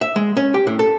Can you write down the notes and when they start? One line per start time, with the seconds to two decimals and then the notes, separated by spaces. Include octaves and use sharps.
0.01 E5
0.16 G#3
0.37 C#4
0.54 G4
0.67 A2
0.79 A4